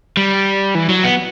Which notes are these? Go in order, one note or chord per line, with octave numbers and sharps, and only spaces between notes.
G3
E3
F#3
B3